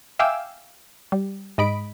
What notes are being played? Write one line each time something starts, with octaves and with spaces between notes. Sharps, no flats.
E5 F5 G5 G#5 D6 E6
G3
G#2 D#5 B5 D7